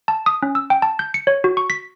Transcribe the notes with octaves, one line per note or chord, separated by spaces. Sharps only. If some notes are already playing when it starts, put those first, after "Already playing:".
A5
D#6
C#4
E6
G5
A5
G6
C#7
C#5
F#4
C#6
B6